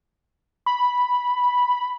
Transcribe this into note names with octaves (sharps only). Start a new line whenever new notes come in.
B5